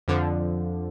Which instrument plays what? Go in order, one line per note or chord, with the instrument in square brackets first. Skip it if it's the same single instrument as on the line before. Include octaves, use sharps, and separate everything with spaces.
[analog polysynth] F2 D3 F3